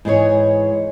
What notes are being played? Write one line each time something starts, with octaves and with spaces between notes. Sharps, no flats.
G#2 E3 G#4 C#5